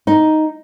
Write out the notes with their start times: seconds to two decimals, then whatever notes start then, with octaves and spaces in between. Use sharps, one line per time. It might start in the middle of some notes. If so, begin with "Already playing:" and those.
0.07 D#4